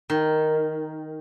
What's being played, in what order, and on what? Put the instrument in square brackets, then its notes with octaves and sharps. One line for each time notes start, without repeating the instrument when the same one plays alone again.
[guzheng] D#3